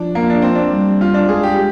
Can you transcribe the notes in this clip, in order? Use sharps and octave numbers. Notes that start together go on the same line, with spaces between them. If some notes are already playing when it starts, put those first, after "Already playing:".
Already playing: F3 D4
A#3
D4
C4
D4
G3
F4
D4
G#3 G#4
G4